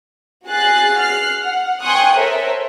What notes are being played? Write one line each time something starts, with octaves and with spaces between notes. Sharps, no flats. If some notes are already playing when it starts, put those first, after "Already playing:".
F#4 G#4 F#6 A6 C7
F6 F#6 C7
F#5
G5 G#5 C6 C#6 D#6 F#6
A4 A#4 C5 C#5 E5